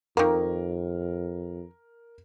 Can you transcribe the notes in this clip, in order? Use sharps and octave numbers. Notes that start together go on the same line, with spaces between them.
F2 D#3 A#3 A#4